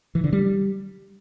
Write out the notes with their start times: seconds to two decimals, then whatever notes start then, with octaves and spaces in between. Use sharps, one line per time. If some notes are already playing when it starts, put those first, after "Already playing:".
0.15 E3
0.24 D3
0.33 G3